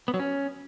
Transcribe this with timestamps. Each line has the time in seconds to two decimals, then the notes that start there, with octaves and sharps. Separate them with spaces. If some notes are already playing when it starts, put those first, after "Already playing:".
0.08 B3
0.14 F#3
0.20 C#4